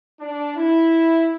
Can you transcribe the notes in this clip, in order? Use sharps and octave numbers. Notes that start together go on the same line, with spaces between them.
D4
E4